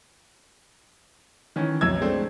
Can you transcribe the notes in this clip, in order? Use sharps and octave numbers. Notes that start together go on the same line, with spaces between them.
D#3 E3 C#4
B1 F2 E6 G#6
G#3 A3 C4 D4 A4